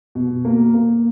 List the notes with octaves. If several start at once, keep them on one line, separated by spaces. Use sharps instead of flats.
B2
A#3
A#3